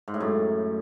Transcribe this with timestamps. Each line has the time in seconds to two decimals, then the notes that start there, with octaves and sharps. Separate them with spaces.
0.08 G#2
0.14 A2
0.20 F#2